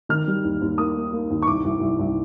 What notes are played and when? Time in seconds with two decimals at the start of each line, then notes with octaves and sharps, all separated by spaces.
0.09 D#3 F6
0.27 G3
0.44 D#2
0.61 D#2
0.78 A#3 D#6
0.96 A#3
1.12 A#3
1.30 D#2
1.42 C#6
1.47 C2 D6
1.65 C2
1.81 C2
1.99 C2